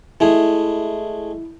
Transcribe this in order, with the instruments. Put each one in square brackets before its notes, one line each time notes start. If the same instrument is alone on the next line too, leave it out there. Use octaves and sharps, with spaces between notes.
[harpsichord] G#3 A3 G#4 [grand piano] E4